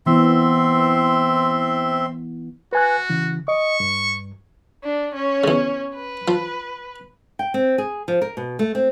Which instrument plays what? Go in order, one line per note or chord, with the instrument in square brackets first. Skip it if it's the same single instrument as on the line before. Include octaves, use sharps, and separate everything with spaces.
[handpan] E3 B3 E4 [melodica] C4 E5 C6
[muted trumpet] F#4 [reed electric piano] B4 G#5 F#6
[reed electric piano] C#3 E3
[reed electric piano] D#5 [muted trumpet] C#6
[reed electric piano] G2
[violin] D4
C#4 C#5
[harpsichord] E2 C#3
[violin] B4
[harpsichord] F3
[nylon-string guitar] G5
C4
G#4
F3
A#4
B2
A3
C4